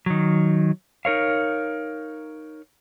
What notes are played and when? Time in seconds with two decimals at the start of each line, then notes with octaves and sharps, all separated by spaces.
0.06 D#3 F#3
1.05 D#4 A#4 C#5 F5